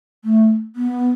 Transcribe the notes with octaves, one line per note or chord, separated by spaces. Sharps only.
A3
B3